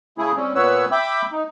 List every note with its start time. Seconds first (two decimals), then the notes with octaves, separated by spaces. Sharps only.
0.18 C#3 A3 E4 G#4
0.36 G3 C4 C#4
0.55 A#2 B3 B4 C#5 E6
0.92 E5 G5 B5 D6
1.32 D#4